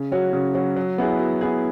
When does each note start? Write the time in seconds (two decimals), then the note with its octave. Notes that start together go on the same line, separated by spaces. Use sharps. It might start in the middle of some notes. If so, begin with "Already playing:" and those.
Already playing: C#3
0.11 F#3 C#4 F#4
0.33 C#3
0.55 F#3 C#4 F#4
0.76 F#3
0.98 B3 E4 G#4
1.19 F#3
1.41 B3 E4 G#4